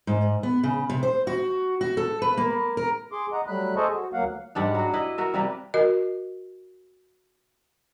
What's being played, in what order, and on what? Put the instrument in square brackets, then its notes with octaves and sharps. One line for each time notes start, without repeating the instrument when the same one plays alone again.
[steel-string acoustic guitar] G#2
B3
C#3
C3
C5
F#4
F#4
A4
B4
A#3
A#4
[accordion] G#4 C6 D6
D#5 F#5 A#5
F#3 G3 A3 B5 F#6
G#4 A4 C5 D#5 A5 C#6
F#4
D2 F#3 A#3 F5 F#5
[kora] G#2 G3 D4 F#5
F#3 F#4
E4 B4 D#5
F#4 A#4 E5
C3 G3 A#3 B4
[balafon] F#4 A#4 D#5